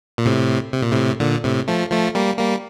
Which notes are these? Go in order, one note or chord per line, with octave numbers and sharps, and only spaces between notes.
A#2
A2 C3
C3
A#2
A2 C3
A#2 D3
A2 C3
F3 A3
F3 A3
G3 A#3
G3 A#3